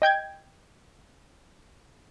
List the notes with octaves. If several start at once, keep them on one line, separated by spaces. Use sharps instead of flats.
D#5 G5 G6 G#6